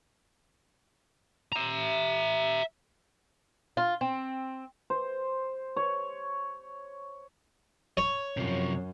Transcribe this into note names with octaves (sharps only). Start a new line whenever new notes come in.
E5 A#5
F4
C4
C5
C#5
C#5
F#2 C3 F3